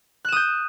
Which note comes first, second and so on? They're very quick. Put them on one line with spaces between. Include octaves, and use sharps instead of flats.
F#6 E7 D#6 G6